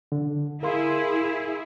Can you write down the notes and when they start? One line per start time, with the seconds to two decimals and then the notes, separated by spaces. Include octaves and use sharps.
0.12 D3
0.63 E4 G#4 A#4 F5 C6